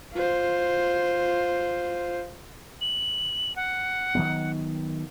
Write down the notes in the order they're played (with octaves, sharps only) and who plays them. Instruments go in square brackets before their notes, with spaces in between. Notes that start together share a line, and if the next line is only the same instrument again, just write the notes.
[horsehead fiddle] F4 C5
[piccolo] F#7
F#5
[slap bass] D#3 F#3 B3